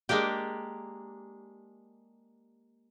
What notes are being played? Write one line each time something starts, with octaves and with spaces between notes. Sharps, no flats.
G#3 A#3 D4 G4